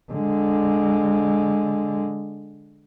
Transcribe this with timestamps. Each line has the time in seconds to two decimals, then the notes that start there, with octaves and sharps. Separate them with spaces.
0.12 D3 G#3